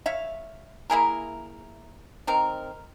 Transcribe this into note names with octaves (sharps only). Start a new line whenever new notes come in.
C#5 E5 F5
A#3 E4 G#4 A#4
D#3 C4 A#4